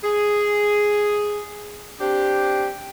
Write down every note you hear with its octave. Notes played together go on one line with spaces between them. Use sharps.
G#4
C4 D4 G4